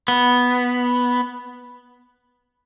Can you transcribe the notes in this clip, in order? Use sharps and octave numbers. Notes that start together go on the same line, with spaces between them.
B3